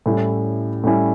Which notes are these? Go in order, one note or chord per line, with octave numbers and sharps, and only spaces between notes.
A2 G3 C#4 E4
A2 G3 C#4 E4